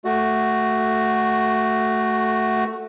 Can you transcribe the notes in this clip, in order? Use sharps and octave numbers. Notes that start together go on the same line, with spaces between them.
A3 F#4